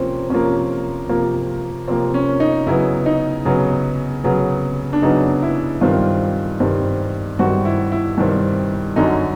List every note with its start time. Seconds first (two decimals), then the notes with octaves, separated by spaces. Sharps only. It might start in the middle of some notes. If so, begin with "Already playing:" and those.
Already playing: C3 F3 A#3 C4 C#4
0.30 C3 F3 A#3 C#4
1.09 C3 F3 A#3
1.87 C3 F3 A#3 C4
2.14 C#4
2.40 D#4
2.67 C#3 F#3 B3 E4
3.06 D#4
3.45 C#3 F#3 B3
4.24 C#3 F#3 B3
4.93 D4
5.02 C#3 F#3 B3 D#4
5.42 E4
5.81 G2 D#3 G3 C4 F4
6.60 G2 D#3 G3 C4
7.39 G2 D#3 G3 C4 F#4
7.65 E4
7.92 E4
8.18 G2 D#3 G3 C4
8.96 F#2 D3 F#3 D#4